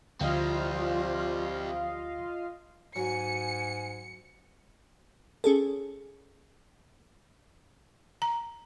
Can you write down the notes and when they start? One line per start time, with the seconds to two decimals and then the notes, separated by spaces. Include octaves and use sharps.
0.21 D2 F3 G3 C4 F4 D#5 F5
2.96 G#2 F#3 G#5 C#7
5.44 C#4 G#4 A4
8.22 A#5